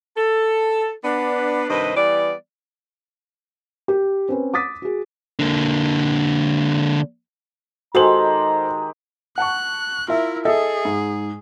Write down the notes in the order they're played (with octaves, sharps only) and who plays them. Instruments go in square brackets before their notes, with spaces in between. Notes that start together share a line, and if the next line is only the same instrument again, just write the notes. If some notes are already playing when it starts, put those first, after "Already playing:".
[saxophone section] A4
B3 D4 B4
G2 C3 D#3 B4 C5 D#5
E3 G3 B3 D5
[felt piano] G4
C4 C#4 B4
D6 D#6 A6 B6
F#4 G#4
[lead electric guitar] D3 A#3
[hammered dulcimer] D#3 G#3 G4 [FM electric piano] F#4 [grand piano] A4 C5 F#7 [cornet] A#5
[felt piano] F#5 A5 C#6 [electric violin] F#6
[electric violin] E4 A#4 [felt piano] F4 E5
[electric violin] G#4 [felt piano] A4 D#5 E5
[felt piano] G#2